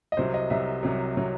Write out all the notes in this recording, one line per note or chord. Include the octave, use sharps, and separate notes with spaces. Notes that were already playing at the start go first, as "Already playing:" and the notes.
D#5
C2 C3 F#3 C5
D#5
C2 C3 F#3 E5
C2 C3 F#3
C3 F#3